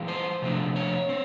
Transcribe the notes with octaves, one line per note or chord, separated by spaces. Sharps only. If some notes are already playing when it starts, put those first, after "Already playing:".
Already playing: E3 G#3 C4 F4
C5
C3 F3 A3 D4
C#5
C4